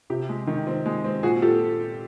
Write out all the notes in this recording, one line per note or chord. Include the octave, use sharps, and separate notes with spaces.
C3 G4
G#3
D#3
C4
G#3
C4
A#2 F#4 G#4
A#2 G4 A4